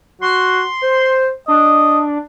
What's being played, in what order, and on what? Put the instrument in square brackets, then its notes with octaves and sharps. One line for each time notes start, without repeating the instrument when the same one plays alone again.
[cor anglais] F#4 [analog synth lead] C6
[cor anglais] C5
[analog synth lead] D4 [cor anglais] D#5